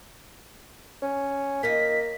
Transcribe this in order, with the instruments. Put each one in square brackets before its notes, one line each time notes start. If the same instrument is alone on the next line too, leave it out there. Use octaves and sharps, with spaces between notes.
[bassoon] C#4
[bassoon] A#3 [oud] D#4 F4 D#5 [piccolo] B6